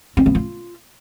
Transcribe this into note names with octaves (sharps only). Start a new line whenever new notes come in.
C4
B3
F4